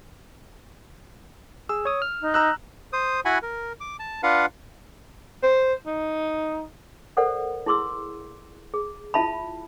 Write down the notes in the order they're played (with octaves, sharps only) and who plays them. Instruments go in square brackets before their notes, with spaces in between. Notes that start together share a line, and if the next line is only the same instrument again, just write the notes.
[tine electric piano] G#4 [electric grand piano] E6
[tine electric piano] C#5 D#6
F6
[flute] D#4
[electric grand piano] A#5 E6 F#6
[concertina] C5 D#6
E4 F#4 F#5 G#5 B5
A#4
D6
A5
D4 F4 B4 F5 F#5
[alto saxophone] C5
D#4
[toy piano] A4 A#4 C5 D5 F#5
E4 G#4 C6 D6 E6
G#4
E4 F4 E5 A5 B5